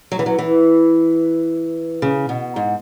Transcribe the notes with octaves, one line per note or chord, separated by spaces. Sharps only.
F#3
E3
F#3
E3
C#3
B2
G#2